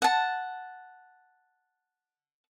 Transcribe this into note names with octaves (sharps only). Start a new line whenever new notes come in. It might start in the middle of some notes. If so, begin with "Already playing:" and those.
F#5 A5